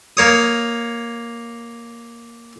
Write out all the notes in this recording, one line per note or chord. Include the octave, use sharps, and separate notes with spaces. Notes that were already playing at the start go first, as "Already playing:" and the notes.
A#3 C#5 D#6